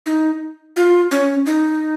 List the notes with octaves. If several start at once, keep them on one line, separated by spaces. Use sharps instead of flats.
D#4
F4
C#4
D#4